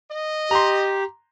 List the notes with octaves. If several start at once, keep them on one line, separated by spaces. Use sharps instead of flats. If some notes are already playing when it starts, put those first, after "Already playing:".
D#5
G4 A#5 C6